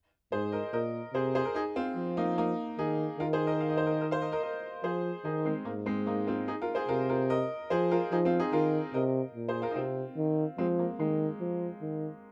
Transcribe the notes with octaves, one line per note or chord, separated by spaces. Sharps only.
G#2 G#4 C5
A#4 D#5
A#2 A#4 D#5
C3 G#4 C5
G#4 C5
A#4
D#4 G#4
C4 F4
F3
A#3 D#4
A#3 D#4
D#3 D#4 G#4
D#3 F4 A#4
G#4 C5
A#4 D#5
F5
D#5
C5
A#4 D#5
A#4 D#5
C5 F5
A#4 D#5
A#4 D#5
A#4 D#5
F3 G#4 C5
D#3 D#4 G#4
G#3 C4
G#2 A#3
G#3 C4
A#3 D#4
C4 F4
D#4 G#4
F4 A#4
G#4 C5
C3 F4 A#4
F4 A#4
A#4 D#5
F3 G#4 C5
F4 A#4
F3 D#4 G#4
C4 F4
D#4 G#4
D#3 F4 A#4
C3 A#4 D#5
A#2
G#4 C5
F4 A#4
D#4
C3 C4 F4
D#3
F3 G#3 C4
A#3
D#3 G#3
F3
D#3